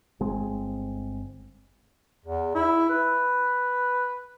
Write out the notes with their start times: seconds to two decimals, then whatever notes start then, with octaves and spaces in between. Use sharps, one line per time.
0.20 G1 G#3 C4
2.25 E2
2.55 E4
2.89 B4